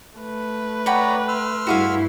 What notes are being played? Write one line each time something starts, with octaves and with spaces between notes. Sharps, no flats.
A3 B4
C#5 D5 F#5 G5 A#5 B5
C6 E6 F6
G2 E4 F#4 G#4 F5